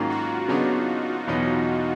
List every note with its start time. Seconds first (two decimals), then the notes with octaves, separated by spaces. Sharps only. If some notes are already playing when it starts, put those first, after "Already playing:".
Already playing: G#2 D#3 F#3 A#3 C#4 F4
0.09 F#4
0.48 C#3 F#3 B3 D4 D#4
1.27 E2 B2 F#3 B3 D#4